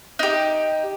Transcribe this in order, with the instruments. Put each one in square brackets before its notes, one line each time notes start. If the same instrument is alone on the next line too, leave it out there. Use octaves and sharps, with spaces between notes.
[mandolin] D#4 G4